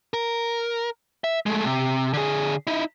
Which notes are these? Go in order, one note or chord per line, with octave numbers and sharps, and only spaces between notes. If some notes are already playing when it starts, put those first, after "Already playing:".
A#4
E5
G#3 A3
C3
D3 G#4
D#4 E4